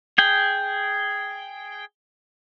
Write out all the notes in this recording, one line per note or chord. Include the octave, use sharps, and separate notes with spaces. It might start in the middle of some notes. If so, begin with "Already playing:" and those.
G#4 G5